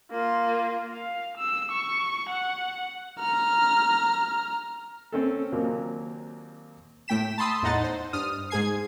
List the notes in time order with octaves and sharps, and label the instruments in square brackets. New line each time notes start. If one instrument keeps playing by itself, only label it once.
[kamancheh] A#3 F4
[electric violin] F5
E6
C#6
F#5
A#5 F6
[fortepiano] C4 C#4 A4
D#2 A#2 F#3 A#3 C4
[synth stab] A2 A3 G5 B6 E7
A5 B5 C6 D#6 E6
E2 A2 D#4 D#5 F#5 A6
C5
G2 D#6 F6
G#2 G#4 G#5 G#6 C7